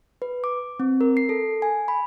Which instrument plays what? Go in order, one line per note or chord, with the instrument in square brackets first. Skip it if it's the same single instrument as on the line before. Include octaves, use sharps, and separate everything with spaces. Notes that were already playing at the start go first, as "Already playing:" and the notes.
[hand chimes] B4
D6
C4
A#4
C7
A4
G#5
B5